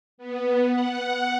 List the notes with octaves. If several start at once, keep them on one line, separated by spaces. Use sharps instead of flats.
B3
F#5